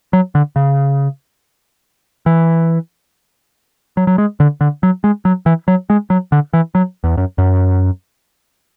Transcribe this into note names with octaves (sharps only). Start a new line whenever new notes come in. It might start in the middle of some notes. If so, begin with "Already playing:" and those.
F#3
D3
C#3
E3
F#3
F#3
G#3
D3
D3
F#3
G#3
F#3
E3
F#3
G#3
F#3
D3
E3
F#3
E2
F#2
F#2